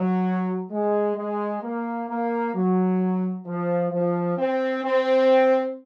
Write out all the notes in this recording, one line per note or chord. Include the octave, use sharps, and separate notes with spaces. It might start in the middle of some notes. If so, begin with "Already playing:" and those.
Already playing: F#3
G#3
G#3
A#3
A#3
F#3
F3
F3
C4
C4